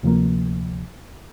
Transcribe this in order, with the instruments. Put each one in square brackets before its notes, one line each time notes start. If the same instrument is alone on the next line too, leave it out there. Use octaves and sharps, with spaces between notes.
[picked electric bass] D2 C3 F3 A#3